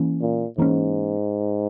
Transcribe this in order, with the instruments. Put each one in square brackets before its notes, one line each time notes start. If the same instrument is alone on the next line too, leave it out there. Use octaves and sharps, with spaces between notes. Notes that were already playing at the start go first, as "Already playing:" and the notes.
Already playing: [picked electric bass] E3 A#3 C#4
[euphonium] A#2
[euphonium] G#2 [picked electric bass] E3 A#3 C#4